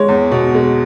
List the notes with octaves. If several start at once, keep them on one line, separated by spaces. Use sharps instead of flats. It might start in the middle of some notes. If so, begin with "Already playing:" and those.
Already playing: G#3 C#5
E2
B2
G#3